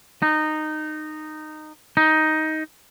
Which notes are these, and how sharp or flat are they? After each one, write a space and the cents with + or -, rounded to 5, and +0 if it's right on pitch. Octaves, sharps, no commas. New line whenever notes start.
D#4 -15
D#4 +10